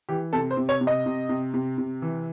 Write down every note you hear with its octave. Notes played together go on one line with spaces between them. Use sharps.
E3 G4
C3 A4
C5
C3
C#5
C3
D#5
C3
C3
C3
C3
E3